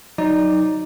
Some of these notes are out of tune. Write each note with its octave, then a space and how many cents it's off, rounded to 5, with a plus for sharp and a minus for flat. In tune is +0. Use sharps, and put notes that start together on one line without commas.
F#3 +0 D#4 +0 D5 +0